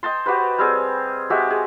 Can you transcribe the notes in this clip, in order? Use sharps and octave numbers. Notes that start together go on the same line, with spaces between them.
D#5 G5 A5 C6
F#4 G4 B4 C5
G3 C4 G#4
G#3 F#4 G4 E5
G#4